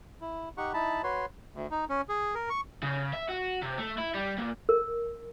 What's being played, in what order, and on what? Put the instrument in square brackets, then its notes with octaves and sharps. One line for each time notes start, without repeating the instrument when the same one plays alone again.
[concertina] E4
D#4 G4 F#5 C#6
D#4 E4 A5 B5
F#4 B4 C#5 C6
[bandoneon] D2
D#4
C#4
G#4
A#4
C#6
[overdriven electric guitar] C#3
E5
F#4
C3
A3
E4
G3
A#2
[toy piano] A#4